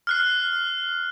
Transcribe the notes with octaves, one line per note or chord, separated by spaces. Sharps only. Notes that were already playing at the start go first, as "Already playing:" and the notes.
F6 F#6 C7